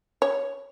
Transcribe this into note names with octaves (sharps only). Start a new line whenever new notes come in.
C#5